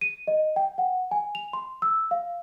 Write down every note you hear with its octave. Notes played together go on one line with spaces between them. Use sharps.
D#7
D#5
G5
F#5
G#5
F7
C6
E6
F5